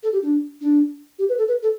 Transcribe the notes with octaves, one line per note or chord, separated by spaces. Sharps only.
A4
G4
D4
D4
G4
B4
A4
B4
A4